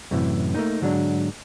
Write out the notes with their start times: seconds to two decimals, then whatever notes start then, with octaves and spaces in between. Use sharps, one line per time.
0.11 F#2 A2 C3 D#3 E3
0.55 A3 A#3 D#4
0.82 G#2 D3 F#3 D4